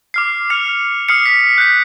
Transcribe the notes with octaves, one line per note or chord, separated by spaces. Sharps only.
D6 F6 C7
F6 C7 C#7 F7
D#6 F6 C7 C#7
B6
F#6 G6 B6